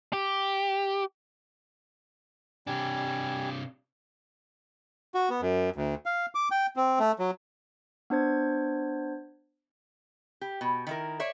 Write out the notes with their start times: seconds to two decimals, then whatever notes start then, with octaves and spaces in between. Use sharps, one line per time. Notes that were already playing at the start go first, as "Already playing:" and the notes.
0.13 G4
2.67 C3 G3 D4 G#5
5.15 F#4
5.30 B3
5.41 F#2
5.76 D2
6.06 F5
6.35 D6
6.51 G5
6.76 C4
6.99 A3
7.19 F#3
8.10 B3 D4 C5 G#6
10.41 G4
10.61 B2
10.87 D#3 E4 A#4
11.20 C#5 D5 E5